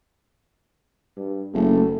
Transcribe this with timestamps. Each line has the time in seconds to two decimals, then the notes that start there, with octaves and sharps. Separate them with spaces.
1.17 G2
1.54 F#1 A3